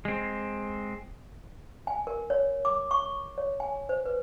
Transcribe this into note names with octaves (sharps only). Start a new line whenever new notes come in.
G#3 C4
G#5
A#4
C#5
D6
C#6
C#5
G#5
C5
B4